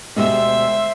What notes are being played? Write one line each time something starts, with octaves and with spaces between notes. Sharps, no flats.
D2 B2 G#3 G4 C5 E5